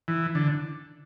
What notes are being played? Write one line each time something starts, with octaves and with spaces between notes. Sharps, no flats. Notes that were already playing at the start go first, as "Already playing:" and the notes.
E3
D3